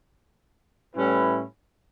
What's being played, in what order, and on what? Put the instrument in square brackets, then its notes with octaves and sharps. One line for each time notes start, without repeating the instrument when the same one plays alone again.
[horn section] A2 G3 C#4 E4 B4